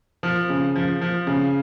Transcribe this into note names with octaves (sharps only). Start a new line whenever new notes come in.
F3
C#3
F3
F3
C#3